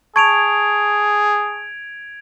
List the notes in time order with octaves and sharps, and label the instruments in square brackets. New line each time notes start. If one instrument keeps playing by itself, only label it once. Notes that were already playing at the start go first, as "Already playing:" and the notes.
[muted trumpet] G#4 [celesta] A5 C#6 [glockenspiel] G#6 D7 F7